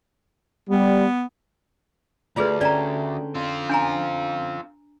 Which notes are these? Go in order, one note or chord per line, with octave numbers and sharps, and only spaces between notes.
G3 B3
D2 A3 F4 G#4 B4 D5 A#5
D3 C#4 D5 G5 A#5
C4 F4
D4 G#5 A#5